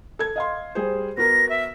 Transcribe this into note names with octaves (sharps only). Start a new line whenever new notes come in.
A4 G#6
D#5 F5 C6
G3 G#4 C5
B3 F#4 A#4 A#6
E5